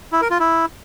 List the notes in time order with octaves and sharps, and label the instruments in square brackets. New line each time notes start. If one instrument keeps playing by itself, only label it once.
[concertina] E4
A#4
F4
E4